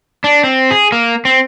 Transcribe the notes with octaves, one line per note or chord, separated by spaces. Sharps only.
D4
C4
G#4
A#3
C4